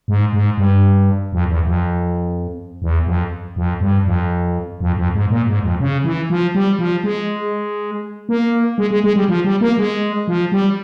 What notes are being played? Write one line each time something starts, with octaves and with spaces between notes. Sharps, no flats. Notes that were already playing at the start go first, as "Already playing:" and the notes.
G#2
G#2
G2
F2
E2
F2
E2
F2
F2
G2
F2
F2
F2
G#2
A#2
G#2
F2
C#3
E3
F3
G3
F3
G#3
A#3
G#3
G#3
G#3
G3
F3
G3
A#3
G#3
F3
G3